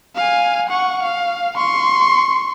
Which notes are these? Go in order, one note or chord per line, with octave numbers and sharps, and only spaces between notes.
F5 G#5
F#5 C#6
F5
C6 C#6